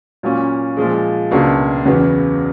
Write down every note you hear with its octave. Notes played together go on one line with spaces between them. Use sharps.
A#2 F#3 A#3 C#4
A#2 F3 G#3
C#2 B2 F#3 A#3 D4
E2 C#3 F#3 B3